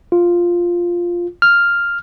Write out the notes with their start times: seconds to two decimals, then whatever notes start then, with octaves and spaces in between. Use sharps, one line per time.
0.12 F4
1.42 F6